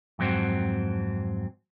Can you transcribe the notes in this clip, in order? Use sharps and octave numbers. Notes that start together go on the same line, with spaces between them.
F2 G#2 F#3 C4